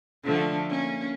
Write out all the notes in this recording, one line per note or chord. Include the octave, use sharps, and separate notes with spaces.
D3 F3 A3
A#3 C#4